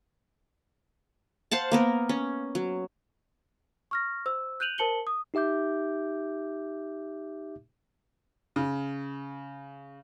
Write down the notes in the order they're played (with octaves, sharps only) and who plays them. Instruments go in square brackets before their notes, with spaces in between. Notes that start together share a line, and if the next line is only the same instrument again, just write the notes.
[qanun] C5 F5 F#5 A5
A#3 B3 A#4
C#4
F#3
[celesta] C#6 F6 A#6
C5 E6
F#6 G6 D#7 F7 F#7
A#4 C5 A5 C#7 F#7 G7
D#6
[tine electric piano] D#4 G4 E5 D6 G6
[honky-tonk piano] C#3